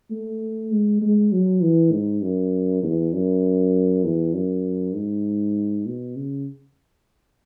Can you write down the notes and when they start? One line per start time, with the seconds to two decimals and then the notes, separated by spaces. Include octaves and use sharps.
0.10 A3
0.71 G#3
1.01 G#3
1.32 F#3
1.62 E3
1.92 G#2
2.22 F#2
2.83 E2
3.13 F#2
4.04 E2
4.34 F#2
4.95 G#2
5.86 B2
6.16 C#3